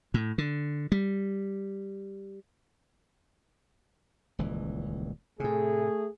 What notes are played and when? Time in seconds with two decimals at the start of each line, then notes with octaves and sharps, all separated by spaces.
0.14 A2
0.38 D3
0.92 G3
4.39 D#1 C#2 E3
5.40 A2 C3 A3 G#4